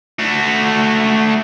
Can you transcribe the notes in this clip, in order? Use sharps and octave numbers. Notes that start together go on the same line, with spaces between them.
A3 F#4